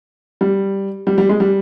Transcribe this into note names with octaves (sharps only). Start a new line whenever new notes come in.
G3
G3
G3
G#3
G3